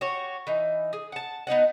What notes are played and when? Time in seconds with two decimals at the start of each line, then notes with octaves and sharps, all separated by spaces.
0.01 F#4 G4 C#5
0.47 E3 D#4
0.93 G#4
1.12 F#5 A5
1.47 B3 D#4 D#5 F#5